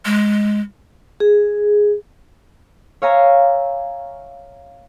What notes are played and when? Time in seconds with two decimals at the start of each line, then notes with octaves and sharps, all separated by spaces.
0.05 G#3
1.20 G#4
3.02 C#5 E5 F5 G#5 A#5